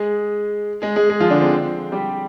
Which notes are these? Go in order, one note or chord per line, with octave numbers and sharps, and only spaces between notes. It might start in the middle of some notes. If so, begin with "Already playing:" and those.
Already playing: G#3 G#4
G#3 G#4
G#3 G#4
G#3 G#4
F3 F4
D3 D4
C4
G3 G4